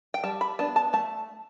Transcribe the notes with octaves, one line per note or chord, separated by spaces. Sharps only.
G5
G3 A5
B5
B3 D4 A5
A5
A3 A5